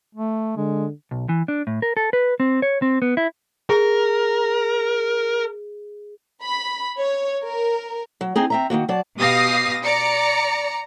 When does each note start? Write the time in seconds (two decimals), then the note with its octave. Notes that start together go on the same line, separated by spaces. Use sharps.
0.15 A3
0.57 D3 G#3
1.11 B1
1.29 E3
1.48 D4
1.67 A2
1.82 A#4
1.97 A4
2.13 B4
2.40 C4
2.62 C#5
2.82 C4
3.02 B3
3.17 E4
3.70 G#4 A#4
6.41 B5
7.00 C#5
7.44 A#4
8.21 F#3
8.36 C4 D#4 G#4
8.50 C4 E5 A#5
8.70 D#3 F#3 A#3 F#4
8.89 F#3 D5 A5
9.20 B2 G4 F5 D#6 A#6 C7
9.84 D5 A#5 C#7